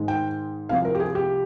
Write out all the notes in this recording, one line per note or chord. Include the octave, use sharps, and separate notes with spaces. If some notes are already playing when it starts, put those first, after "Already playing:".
Already playing: G#2 D#3 G#3 D#4
G5
C2 C3 F3 F5
A#4
G4
G#4
G4